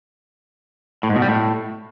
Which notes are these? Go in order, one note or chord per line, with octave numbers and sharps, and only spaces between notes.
A2
G#2
B2
G3
A2